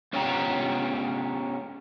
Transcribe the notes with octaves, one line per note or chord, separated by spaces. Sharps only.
B3 C#4 F4 G4 G5 A#5